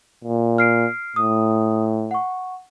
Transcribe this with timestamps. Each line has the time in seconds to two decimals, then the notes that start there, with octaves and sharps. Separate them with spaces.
0.24 A#2
0.58 F6 C7 D7
1.16 A2 D#6
2.11 F#5 C#6